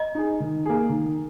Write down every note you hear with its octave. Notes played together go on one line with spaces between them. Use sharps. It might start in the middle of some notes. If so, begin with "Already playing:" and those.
Already playing: D#5
D#4 G#4
D#3
A#3 G#4
D#3